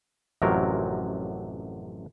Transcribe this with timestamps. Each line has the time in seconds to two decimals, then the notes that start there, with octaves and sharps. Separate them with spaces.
0.42 A1 F#2 C3 F3 F#3 A#4